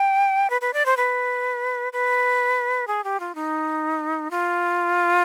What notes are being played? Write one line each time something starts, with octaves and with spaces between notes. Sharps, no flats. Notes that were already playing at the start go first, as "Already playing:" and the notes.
Already playing: G5
B4
B4
D5
C5
B4
B4
G#4
G4
F4
D#4
F4